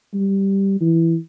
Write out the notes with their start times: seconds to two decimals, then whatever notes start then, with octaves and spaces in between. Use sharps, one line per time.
0.14 G3
0.81 E3